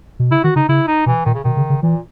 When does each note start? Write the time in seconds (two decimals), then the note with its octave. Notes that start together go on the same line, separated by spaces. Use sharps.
0.20 B2
0.31 C#3 E4
0.44 D#3 F#4
0.56 C#3 D#4
0.69 C#3 E4
0.87 D#4
1.06 B2 E3
1.25 A#2 D#3
1.34 C#3
1.44 B2 D#3
1.57 C#3
1.70 C#3
1.83 A#2 E3